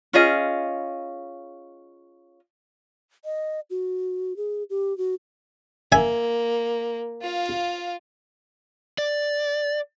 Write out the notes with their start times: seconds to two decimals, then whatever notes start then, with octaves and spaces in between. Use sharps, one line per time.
0.13 C#4 F4 G#4 D#5
3.25 D#5
3.70 F#4
4.37 G#4
4.70 G4
4.98 F#4
5.92 A#3 E5 G#5
7.22 F4 F5
8.98 D5